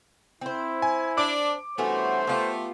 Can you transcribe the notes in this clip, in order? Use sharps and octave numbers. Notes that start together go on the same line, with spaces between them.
C4 E4 C5
G#5
D4 D6
G2 E3 A3 B3 C#4 F#4 C5
A3 B3 F4 G4